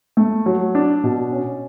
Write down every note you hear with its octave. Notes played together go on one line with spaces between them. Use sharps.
A3
F#3
D4
B2
C#4